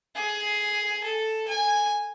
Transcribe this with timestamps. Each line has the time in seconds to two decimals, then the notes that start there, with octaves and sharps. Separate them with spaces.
0.16 G#4
1.04 A4
1.48 G#5